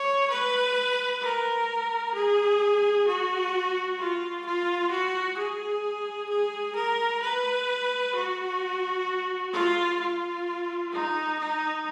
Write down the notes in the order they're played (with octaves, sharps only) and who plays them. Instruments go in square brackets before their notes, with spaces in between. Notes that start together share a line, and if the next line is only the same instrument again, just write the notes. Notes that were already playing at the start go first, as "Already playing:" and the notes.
Already playing: [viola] C#5
B4
A#4
G#4
F#4
F4
F4
F#4
G#4
G#4
A#4
B4
F#4
F4
F4
D#4
D#4